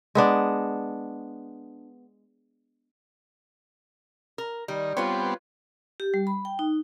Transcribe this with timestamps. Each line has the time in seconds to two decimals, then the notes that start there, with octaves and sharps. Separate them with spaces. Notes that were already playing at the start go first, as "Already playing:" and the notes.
0.15 G#3 B3 D4
4.38 A#4
4.68 D#3 G3
4.97 G3 B3 C4 F4 B4 C#5
6.00 G4
6.14 G3
6.27 B5
6.45 G5
6.59 D#4